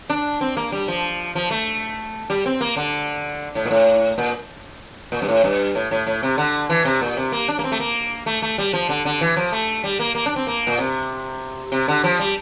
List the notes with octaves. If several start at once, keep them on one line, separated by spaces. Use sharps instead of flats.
D4
C4
A#3
G3
F3
F3
A3
G3
C4
A#3
D3
A2
A#2
A2
A#2
A#2
G2
A2
G2
A2
A2
A2
C3
D3
E3
C3
A#2
C3
A#3
D4
A#3
C4
A3
A#3
A3
A3
G3
F3
D3
D3
E3
F3
A3
G3
A#3
A#3
D4
C4
A#3
A#2
C3
C3
D3
F3
G3